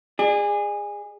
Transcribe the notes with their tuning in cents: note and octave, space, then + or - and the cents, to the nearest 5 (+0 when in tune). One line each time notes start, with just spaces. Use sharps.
G#4 -20 D5 +35